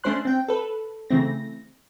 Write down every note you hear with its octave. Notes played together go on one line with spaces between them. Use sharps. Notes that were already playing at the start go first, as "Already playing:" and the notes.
A3 C#4 D4 C5 C6 F#6
C4 G5
A4 B4
C#3 E3 A3 C4 A#6